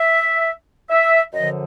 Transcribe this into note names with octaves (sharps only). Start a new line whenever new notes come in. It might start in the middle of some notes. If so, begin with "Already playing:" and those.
Already playing: E5
E5
F#2 D3 F3 D#5